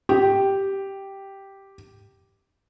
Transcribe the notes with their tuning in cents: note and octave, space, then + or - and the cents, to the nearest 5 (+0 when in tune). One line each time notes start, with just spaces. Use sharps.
G4 -5